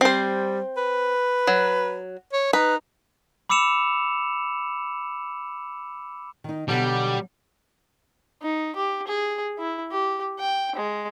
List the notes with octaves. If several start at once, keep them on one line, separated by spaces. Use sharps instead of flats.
G3 C4 C5
B4
F#3
C#5
D#4 B4
B5 D6 E6 C#7 E7 F7
D#3 D#4
B2 D3 F#3 G3
D#4
G4
G#4
E4
G4
G5
G#3